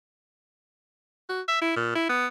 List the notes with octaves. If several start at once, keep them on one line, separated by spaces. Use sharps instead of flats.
F#4
E5
E4
A#2
E4
B3